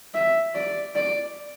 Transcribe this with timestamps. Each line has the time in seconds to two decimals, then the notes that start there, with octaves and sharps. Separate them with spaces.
0.14 E5
0.55 D5
0.95 D5